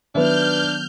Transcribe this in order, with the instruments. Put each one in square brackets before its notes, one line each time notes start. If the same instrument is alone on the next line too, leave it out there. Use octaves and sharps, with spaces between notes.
[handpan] D#3 F#3 B3 [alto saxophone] D4 [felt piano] B4 E5 [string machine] F6 G6